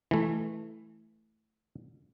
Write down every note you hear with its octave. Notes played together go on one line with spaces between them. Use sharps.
E3 A3